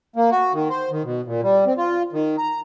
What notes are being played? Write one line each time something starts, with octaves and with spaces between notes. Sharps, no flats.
A#3
F#4
D#3
C5
D#3
B2
A#2
G3
C4
F4
D#3
A#5